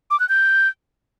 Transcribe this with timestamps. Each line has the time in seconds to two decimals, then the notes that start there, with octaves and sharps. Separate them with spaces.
0.11 D6
0.20 F#6
0.29 G6